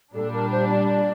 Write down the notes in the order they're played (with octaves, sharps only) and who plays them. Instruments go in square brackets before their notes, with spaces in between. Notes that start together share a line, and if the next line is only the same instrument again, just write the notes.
[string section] A#2 G3 D4 [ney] A4
[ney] A#4
C5
D5